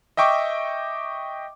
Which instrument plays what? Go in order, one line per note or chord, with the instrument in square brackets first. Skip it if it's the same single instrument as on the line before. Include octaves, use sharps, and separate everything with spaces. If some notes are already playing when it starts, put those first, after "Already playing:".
[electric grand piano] D#5 E5 G5 C#6 D6